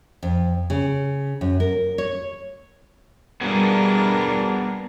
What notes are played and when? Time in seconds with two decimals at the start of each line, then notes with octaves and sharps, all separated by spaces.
0.23 F2
0.70 C#3
1.41 F#2
1.60 A#4
1.98 C#5
3.41 G3 B3 D4 F#4 G#4 A#4